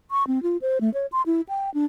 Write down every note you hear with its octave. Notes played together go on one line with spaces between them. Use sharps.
C#6
C4
F4
C5
A3
C#5
C6
E4
G5
D4